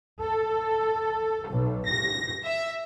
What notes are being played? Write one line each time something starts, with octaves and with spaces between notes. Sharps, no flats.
A4
B1
A#6
E5